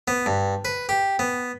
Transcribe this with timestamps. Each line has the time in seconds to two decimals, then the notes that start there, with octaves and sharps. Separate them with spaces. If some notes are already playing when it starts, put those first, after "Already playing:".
0.08 B3
0.26 G2
0.65 B4
0.89 G4
1.19 B3